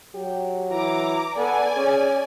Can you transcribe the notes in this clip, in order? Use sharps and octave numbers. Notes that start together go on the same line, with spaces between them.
F#3 G4
E3 A#5 D6
B3 A4 D5 G#5
C#4 G#4